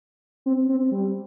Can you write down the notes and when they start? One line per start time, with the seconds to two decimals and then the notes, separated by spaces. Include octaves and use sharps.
0.46 C4
0.69 C4
0.91 G3